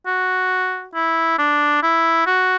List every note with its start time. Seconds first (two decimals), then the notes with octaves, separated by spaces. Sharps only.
0.07 F#4
0.95 E4
1.38 D4
1.83 E4
2.27 F#4